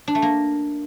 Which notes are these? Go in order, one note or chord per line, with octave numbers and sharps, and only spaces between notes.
D4
A3
A#3